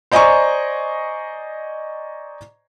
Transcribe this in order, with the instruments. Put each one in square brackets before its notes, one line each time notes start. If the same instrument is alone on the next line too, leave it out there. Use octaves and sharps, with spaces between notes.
[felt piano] C5 D5 D#5 G#5 A#5 C#6